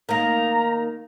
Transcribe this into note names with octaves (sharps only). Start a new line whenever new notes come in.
D#3 A#3 A#5